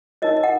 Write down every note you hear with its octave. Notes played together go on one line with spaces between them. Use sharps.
D#4 A#4 C#5 D#5
D#5
F#5